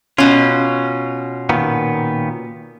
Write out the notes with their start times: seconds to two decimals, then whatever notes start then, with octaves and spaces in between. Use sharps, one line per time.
0.18 B2 C#4 F4
1.49 A#2 D#3 B3